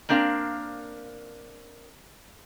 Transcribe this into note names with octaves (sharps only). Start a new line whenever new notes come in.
A#3 C4 D4 A#4 F5